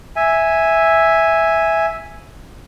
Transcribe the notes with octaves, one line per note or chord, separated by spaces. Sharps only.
E5 G#5